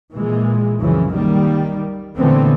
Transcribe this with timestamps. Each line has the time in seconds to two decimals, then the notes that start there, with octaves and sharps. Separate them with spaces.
0.12 A#2 E3 G#3
0.80 C2 F#2 C#3 E3 F3
1.11 D#3 G3 A#3
2.16 A#2 D3 E3 A3 B3 C4